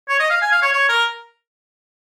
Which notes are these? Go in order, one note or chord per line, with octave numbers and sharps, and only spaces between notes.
C#5
D#5
F5
G#5
F5
C#5
C#5
A#4